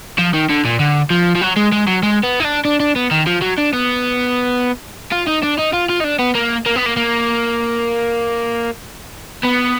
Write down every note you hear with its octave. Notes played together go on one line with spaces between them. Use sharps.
F3
D#3
D3
A#2
D3
F3
F3
F#3
G#3
G#3
F#3
G#3
B3
D#4
D4
D4
D4
B3
D#3
F3
F#3
D4
B3
F4
D#4
D4
D#4
F4
F4
D#4
D4
B3
A#3
A#3
B3
A#3
A#3
B3